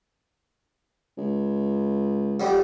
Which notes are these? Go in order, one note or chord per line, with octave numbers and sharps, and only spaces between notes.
C#2
F2 F#3 G3